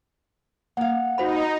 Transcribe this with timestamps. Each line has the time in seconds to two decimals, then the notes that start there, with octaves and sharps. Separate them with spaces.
0.77 A#3 F5 F#5
1.18 D#4 F#4 C5 B5